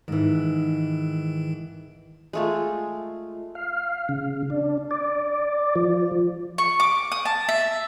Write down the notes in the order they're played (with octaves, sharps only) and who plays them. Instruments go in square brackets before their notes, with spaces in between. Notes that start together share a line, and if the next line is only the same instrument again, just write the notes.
[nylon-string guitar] G#2 E3 [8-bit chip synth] D#3
[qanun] G#3 A3 F4
[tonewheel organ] F5
C#3
D4
D5
F3
[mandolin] C#6
D6
D#6
A5
E5